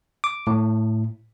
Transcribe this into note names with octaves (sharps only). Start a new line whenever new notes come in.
D6
A2